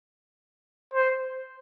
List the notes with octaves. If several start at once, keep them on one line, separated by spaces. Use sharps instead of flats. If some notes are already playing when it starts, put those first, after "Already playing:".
C5